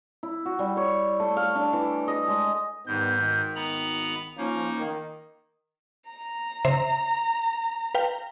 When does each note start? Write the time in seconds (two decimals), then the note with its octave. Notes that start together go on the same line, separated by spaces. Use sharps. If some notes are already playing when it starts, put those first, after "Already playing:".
0.23 E4
0.46 F#4
0.59 G3
0.77 C#5
1.20 A3
1.37 F5
1.55 D4
1.73 E3
2.08 D#5
2.28 G#3
2.87 G#2 D#3 G3 B3 G6
3.19 G#1 D#3
3.56 B3 A#5 B5
4.37 F3 A#3 C#4 D#4
4.78 D#3
6.09 A#5
6.65 C#3 C5 E5
7.95 B4 F5 G5